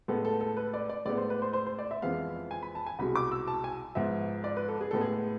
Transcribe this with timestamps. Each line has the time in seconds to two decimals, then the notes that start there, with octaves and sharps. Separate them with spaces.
0.08 A2 G#3 B3 A4
0.25 A4
0.41 A4
0.57 B4
0.74 D5
0.90 D5
1.06 A2 G#3 B3 D5
1.17 C5
1.30 B4
1.42 C5
1.53 C5
1.67 C5
1.79 D5
1.91 E5
2.02 F2 E3 G#3 B3 F5
2.51 G#5
2.63 B5
2.75 A5
2.86 G#5
2.99 C2 B2 G#3 B5
3.16 D6
3.31 E6
3.48 A5
3.64 G#5
3.95 G#2 F3 B3 E5
4.44 D5
4.57 B4
4.68 A4
4.81 G#4
4.91 A2 G#3 B3 A4
5.01 G#4